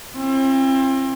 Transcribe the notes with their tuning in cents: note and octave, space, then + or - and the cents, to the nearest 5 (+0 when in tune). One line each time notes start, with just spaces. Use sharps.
C4 +35 E4 +45